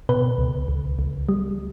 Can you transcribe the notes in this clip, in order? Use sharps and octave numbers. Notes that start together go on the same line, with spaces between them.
B2 B4
C#2
C#2
C#2
G3